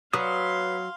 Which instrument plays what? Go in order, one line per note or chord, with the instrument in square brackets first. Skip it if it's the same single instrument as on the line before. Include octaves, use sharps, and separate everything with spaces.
[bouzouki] F#3 [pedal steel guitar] B4 D#6 [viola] F5 C6